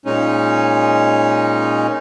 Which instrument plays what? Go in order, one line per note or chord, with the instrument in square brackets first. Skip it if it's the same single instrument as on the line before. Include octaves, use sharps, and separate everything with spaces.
[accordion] A#2 G#3 C#4 D#4